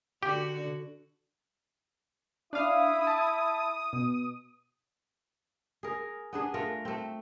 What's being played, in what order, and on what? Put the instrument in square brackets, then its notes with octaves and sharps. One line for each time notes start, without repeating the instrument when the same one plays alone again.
[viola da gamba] D3 F#4 [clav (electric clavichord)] G4
[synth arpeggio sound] D4 F5 [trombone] E4 [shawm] D#6
[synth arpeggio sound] A5
B2
[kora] G#4 A#4
B3 D4 G#4
A3 F4 A#4
A3 C4